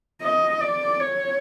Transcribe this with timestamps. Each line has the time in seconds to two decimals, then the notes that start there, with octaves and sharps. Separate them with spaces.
0.23 D#5
0.61 D5
1.00 C#5